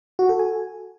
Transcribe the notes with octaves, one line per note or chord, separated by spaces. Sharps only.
F#4
A4
G#5